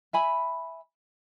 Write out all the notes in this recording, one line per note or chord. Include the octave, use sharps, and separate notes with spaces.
E5 G#5 B5